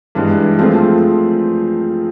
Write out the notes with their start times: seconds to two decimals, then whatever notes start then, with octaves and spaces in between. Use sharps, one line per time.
0.15 G2 E3 G#3
0.59 F3 A3 C4 F4 G#4